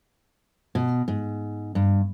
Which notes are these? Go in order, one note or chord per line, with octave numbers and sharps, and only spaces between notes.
B2
G#2
G2